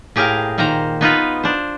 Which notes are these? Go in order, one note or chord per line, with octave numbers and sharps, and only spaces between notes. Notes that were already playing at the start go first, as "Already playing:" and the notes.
A2 G4 G#4 A#4 F5 A#5
A#2 D#3 A#3 C5 A#5
B3 D#4 F4 B4
D4 C5